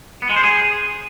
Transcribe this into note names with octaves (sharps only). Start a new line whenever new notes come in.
B3
G#3
C5
G#4